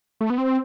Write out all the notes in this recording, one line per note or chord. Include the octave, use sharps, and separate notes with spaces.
A3
B3
C4